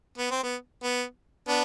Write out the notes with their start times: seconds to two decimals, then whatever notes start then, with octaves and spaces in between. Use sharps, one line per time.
0.18 B3
0.31 C4
0.43 B3
0.83 B3
1.48 B3 D4